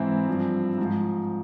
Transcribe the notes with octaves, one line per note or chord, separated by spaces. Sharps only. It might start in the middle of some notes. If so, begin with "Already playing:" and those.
Already playing: G#2 E3 C4 E4
G2 F3
G#2 F3